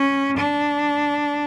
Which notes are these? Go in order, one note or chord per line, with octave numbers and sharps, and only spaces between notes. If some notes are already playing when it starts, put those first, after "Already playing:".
Already playing: C#4
D4